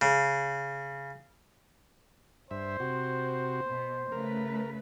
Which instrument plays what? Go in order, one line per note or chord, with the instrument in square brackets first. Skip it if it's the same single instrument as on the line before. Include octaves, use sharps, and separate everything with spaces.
[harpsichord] C#3
[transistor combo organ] G2 E5 [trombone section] C5
[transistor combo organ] C3 F#4
[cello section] B2 B3
[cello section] C#3 A3 B4 [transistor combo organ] A#4